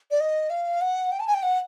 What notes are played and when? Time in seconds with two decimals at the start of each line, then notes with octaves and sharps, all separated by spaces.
0.11 D5
0.20 D#5
0.50 F5
0.81 F#5
1.12 G5
1.20 A5
1.27 G#5
1.34 G5
1.43 F#5